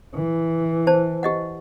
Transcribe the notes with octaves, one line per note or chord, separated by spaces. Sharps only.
E3
C5 A5
G4 D#5 F#5